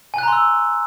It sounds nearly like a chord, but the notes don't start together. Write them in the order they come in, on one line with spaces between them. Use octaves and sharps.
G#5 F#6 A#5 C6 E6